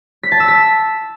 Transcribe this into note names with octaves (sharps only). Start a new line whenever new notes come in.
B6
A5
E6
B6